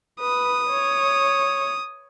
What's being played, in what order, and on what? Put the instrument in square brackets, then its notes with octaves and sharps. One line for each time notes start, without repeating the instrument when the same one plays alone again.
[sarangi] B4 [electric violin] D#6
[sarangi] C#5